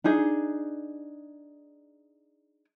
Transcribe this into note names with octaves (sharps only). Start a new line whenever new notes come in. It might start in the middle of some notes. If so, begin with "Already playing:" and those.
D4 D#4 G#4